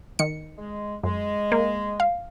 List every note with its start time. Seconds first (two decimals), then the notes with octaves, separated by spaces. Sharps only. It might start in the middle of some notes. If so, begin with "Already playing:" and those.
0.19 D#3 C#7
0.58 G#3
1.04 F#2 G#3
1.52 A#3
2.00 F5